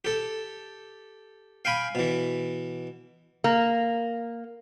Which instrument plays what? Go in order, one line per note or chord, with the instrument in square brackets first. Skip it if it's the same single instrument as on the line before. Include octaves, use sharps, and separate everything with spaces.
[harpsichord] G4 A4
F5 G5 G#5 B5
B2 E3
[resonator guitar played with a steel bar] A#3